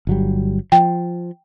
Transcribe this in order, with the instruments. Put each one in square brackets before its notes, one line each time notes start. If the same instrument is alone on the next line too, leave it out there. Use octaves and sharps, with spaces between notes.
[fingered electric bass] G1 F#3 G3
[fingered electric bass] F3 [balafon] G5